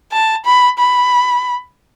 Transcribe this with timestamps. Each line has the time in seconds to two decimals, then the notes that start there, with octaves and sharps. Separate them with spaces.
0.12 A5
0.46 B5
0.79 B5